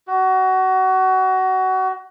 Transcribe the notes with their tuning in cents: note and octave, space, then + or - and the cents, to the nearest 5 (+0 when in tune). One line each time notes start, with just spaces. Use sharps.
F#4 +25